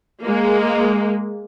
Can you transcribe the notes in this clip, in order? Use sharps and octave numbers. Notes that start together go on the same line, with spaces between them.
G#3 A#3